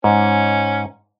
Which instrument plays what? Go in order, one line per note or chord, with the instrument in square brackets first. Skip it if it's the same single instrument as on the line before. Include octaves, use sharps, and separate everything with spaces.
[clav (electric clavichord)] G#2 [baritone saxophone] C#4